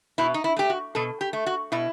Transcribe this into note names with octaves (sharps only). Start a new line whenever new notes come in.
B2 E4
D#4
E4
A3 G4
F#4
B2 A4
G4
A3
F#4
B2 E4